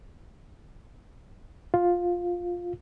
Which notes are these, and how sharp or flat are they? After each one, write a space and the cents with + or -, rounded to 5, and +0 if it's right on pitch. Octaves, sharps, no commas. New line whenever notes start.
F4 +10